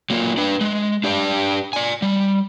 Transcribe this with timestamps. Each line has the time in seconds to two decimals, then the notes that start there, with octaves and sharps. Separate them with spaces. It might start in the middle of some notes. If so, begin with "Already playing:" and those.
0.10 F#3 A#3 F4
0.37 D4 B4
0.61 G#3
1.04 D4 G4 D5 A5
1.73 D5 G#5
2.02 G3